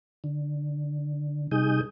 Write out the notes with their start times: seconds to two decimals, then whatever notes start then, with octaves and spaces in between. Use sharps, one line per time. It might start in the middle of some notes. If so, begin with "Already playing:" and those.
0.24 D3
1.51 C3 G3 D#4 G#4 D#6 G6